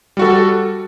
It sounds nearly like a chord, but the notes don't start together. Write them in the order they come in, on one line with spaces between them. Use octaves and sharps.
G3 F#4 A4